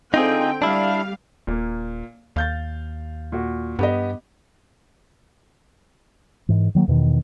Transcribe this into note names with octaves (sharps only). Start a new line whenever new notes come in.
D3 C4 D#4 F4 G#4 G5
G3 D4 E4 F5
D#1 A#2 A#3
D#2 F5 G6 A6
A#2 F#4
G2 B3 G4 D#5
G#2 E3
D#3 F#3 A#3
E2 B2 D#3